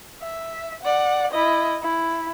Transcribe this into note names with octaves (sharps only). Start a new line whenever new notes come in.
E5
D5 F#5
E4 D#5
E4